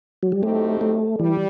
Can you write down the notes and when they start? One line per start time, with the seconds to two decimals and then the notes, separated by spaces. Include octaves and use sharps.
0.23 F#3
0.32 G3
0.42 A2 F#3 A3 C4 D#4 G4
0.81 A3
1.19 E3 G3